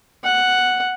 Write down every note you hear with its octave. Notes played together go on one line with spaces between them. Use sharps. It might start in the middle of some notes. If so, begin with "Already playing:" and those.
F#5